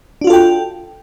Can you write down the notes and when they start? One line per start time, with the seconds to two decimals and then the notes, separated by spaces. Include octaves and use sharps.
0.21 D4
0.24 F#4
0.27 F4
0.30 A4
0.33 G5